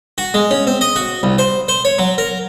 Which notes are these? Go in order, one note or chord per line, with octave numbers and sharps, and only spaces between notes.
F#4
G#3
C#4
C4
D#5
F#4
C2
C5
C5
C#5
F#3
A#4